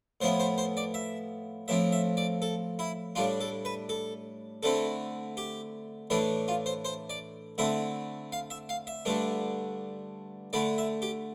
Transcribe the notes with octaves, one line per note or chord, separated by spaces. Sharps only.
A2 F3 B3 E4 C5
C5
C5
D5
E5
A2 F3 C4 E5
E5
D5
A4
E4
A2 G3 D4 F4
A4
B4
A4
D3 A3 C4 E4 A4
G4
A2 E3 A3 D4 E4
F4
C5
C5
D5
D3 A3 C4 E4 E5
F5
E5
F5
E5
G2 D3 A3 D4
D3 A3 E4 D5
E5
G4